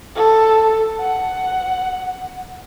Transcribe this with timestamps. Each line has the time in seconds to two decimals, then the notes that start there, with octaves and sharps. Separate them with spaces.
0.16 A4
1.00 F#5